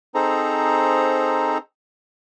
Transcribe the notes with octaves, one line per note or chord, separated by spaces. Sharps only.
C4 D#4 G#4 A4 C5 A#5